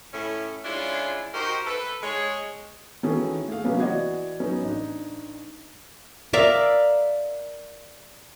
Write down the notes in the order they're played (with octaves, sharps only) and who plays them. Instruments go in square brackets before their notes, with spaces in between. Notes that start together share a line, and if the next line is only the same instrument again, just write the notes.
[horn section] A2 C#4 E4
G#3 C#4 D4 E4 F4
D#4 F#4 G4 A#4 C5 D#5
A4 B4
G#3 C#5
[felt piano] D#3 E3 C#4 F#4 G#4 A4
A3 G#4 F5
C3 F#3 A#3 B3 C#4 D4
E3 F#4 D5 D#5 F#5 G#6
F#3 B3 C#4 D#4
A1 D4 D#4
[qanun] A#4 D5 E5 F5